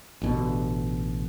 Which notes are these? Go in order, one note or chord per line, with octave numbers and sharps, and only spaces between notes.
A1 B2 D3